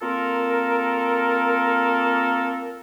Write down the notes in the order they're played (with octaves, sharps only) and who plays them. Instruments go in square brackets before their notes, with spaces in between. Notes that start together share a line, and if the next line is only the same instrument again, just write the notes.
[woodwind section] A#3 C4 F4 A4 A#4